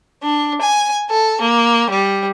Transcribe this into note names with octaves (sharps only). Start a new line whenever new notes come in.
D4
G#5
A4
A#3
G3